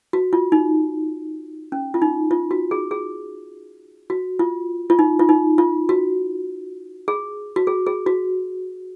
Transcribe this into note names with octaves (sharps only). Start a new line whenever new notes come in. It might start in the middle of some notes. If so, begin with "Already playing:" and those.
F#4
F4
D#4
C#4
F4
D#4
F4
F#4
G#4
G#4
F#4
F4
F4
D#4
F4
D#4
F4
F#4
G#4
F#4
G#4
G#4
F#4